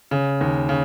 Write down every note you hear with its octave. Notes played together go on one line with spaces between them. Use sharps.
C#3
D#2
C#3